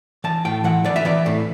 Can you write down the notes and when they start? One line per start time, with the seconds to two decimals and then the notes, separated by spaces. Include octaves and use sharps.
0.24 E3 A5
0.45 A2 G5
0.64 E3 F#5
0.84 E3 D5
0.96 E5
1.05 E3 D5
1.26 A2